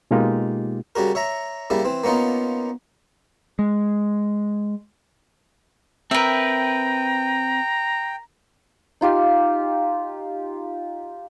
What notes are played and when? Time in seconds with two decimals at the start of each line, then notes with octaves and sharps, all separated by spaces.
0.11 B2 G#3 A#3 D#4 F4 G4
0.95 C#3 G3 F#4 A#4
1.15 C#5 E5 A#5
1.70 C#3 G3 A#3 E4
1.85 E3 C4
2.04 A#3 B3 C#4 D#4 F4
3.59 G#3
6.11 C4 A#4 B4 E5 G5 A#5
9.01 D#4 F4 G4 F5